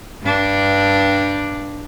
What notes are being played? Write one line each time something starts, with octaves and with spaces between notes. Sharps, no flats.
G2 D4